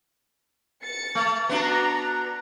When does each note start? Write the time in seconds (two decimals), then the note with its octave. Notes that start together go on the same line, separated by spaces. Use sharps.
0.83 A6 C#7
1.15 A3
1.49 B3 D4 F#4 A#5